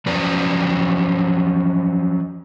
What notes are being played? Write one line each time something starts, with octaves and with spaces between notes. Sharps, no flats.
F3 F#3 C#4 B4 D5